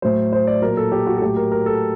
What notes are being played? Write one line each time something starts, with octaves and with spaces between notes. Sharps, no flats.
A2 F#3 C5
C5
D5
A#2 F#3 A#4
A4
G4
F#4
A4
A2 F#3 G4
A#4
A#4
A4